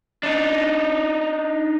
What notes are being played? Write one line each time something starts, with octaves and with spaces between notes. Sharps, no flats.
D4 D#4